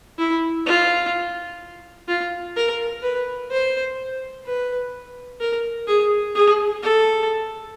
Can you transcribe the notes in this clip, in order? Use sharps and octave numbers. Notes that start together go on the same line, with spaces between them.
E4
F4
F4
A#4
B4
C5
B4
A#4
G#4
G#4
A4